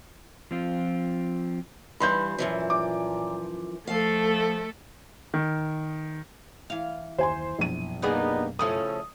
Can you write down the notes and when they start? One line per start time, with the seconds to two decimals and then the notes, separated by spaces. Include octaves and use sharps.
0.51 F3 C4 F4
2.00 G2 E3 G3 B5 C6 G6
2.38 F#2 A#2 E3 F3
2.70 D6
3.87 F3 A3 A4 F5
5.34 D#3
6.70 E3 F5
7.18 F#1 D#2 C5 G#5 C6
7.59 A#1 F#2 B2 D#7
8.02 G3 A#3 B3 D4 D#4 G#4
8.59 A2 C#3 F3 A3 C#4 A4 D#6